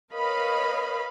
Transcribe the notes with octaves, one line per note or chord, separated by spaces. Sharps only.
A#4 B4 C#5 D#5 F5 B5